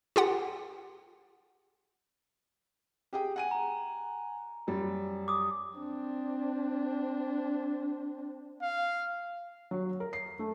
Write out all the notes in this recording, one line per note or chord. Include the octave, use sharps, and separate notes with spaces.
F4 G4 F#5
G4 G#4 G5
F#5 G#5 D#7
A#5
F#2 G3
D6 D#6
C4 D4
F5
F#3
A#4
C7
A3